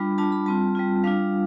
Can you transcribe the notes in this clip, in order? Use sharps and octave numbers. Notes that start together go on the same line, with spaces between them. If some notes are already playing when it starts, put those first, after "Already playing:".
Already playing: G3 D4 F4 B5
G3 D4 F4 A5
B5
G3 C4 F4 A5
G3 C4 F4
G3 D4 F4 F5